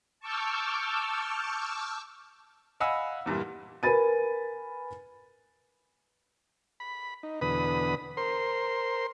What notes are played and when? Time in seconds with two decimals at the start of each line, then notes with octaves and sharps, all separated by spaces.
0.20 A5 C#6 D6 E6 F6 G6
2.80 D#5 F5 F#5 G#5 B5 E6
3.26 E2 G2 A#2 E3
3.83 A#4 B4 G#5 B5 A6 D#7
6.80 B5
7.23 D#4
7.41 E2 B2 D3 B4 B5 D#6
8.17 A#4 C5 C6